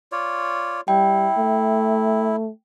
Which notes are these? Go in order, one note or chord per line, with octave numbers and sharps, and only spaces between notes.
F4 C#5 D5
G3 E4 G5
A3